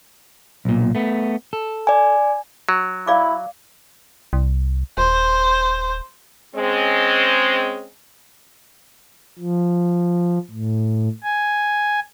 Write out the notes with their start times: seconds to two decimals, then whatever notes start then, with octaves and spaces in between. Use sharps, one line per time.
0.65 B1 A#2
0.95 A3 B3
1.53 A4
1.87 D5 G#5
2.69 F#3
3.07 E4 D5 F5 D6
4.33 C2
4.98 D#1 C5
6.55 G#3 C4 C#4
9.38 F3
10.51 A2
11.24 G#5